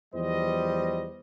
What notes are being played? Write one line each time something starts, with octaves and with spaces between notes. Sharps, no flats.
E2 F3 G3 C5 D#5